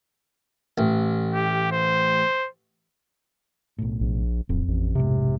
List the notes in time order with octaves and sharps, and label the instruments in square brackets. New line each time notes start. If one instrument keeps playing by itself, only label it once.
[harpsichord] A1
[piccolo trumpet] G4
C5
[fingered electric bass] B1 A2
[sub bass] A#1
[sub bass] D1 [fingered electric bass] F2 C4
[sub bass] A1
[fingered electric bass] F1 B1 G#2 [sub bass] C3